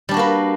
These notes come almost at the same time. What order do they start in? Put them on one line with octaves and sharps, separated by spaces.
G3 D4 F#4 A#3 B4